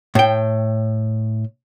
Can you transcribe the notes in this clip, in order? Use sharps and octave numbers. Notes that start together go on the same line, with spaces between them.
A2 G5